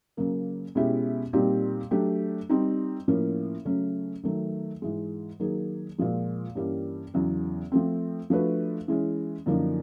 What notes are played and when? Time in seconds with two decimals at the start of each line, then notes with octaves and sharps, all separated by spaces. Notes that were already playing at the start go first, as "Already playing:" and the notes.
0.17 C#3 F#3 A#3
0.75 B2 G#3 C#4 E4 G4
1.33 A#2 G3 C4 D#4 G4
1.91 F#3 A3 D4 G4
2.49 G3 C4 D#4
3.08 A2 F3 A#3 C#4
3.65 C#3 F#3 A3 C#4
4.23 D#3 F#3 A3
4.82 G#2 E3 G#3
5.40 D#3 F#3 A#3 D#4 G#4
5.98 A#2 F3 G#3
6.55 G2 E3 G3 A#3 C#4
7.14 E2 C#3 F#3 B3
7.72 F3 A3 C4
8.30 F3 A3 D4 F#4 B4
8.88 E3 G#3 C#4
9.46 F#2 D3 F3 A#3 D#4